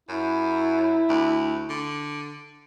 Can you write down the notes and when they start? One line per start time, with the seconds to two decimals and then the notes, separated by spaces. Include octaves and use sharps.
0.09 F#2 E4
1.09 D2
1.69 D3